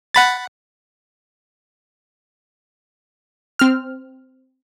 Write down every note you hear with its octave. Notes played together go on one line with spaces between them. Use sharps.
F#5 B5 A6
C4 F6